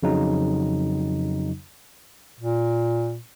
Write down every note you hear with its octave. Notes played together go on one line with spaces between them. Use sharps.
F2 C#3 F#3 D#4
A#2